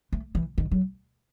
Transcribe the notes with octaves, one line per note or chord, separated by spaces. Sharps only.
A3
E3
D#3
F#3